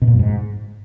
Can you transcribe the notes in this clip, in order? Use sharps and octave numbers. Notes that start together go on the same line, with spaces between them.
B2
A#2
F#2
G#2